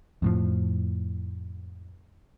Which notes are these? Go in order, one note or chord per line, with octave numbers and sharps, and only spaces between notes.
F2 A2 F3